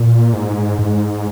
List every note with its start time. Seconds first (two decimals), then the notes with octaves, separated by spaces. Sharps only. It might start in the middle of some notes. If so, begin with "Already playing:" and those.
Already playing: A#2
0.33 G#2
0.79 G#2